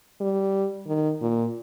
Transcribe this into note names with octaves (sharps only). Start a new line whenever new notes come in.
G3
D#3
A#2